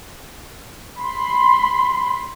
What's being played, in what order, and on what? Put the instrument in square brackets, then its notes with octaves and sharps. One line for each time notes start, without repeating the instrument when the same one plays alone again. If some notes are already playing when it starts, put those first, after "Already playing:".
[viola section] B5 C6